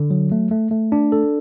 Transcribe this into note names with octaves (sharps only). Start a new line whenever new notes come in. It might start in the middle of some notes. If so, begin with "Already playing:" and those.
Already playing: D3
F#3
A3
A3
A3
D4
A4